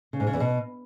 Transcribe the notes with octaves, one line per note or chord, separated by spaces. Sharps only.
C#3
G#2
C#3
E2
B2